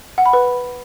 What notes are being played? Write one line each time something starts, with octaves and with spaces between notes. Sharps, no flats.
F#5
B5
B4